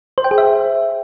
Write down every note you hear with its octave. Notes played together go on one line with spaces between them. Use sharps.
C5
G5
G#4
E5